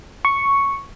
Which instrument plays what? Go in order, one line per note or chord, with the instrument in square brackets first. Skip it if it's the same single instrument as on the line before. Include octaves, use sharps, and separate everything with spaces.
[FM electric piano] C#6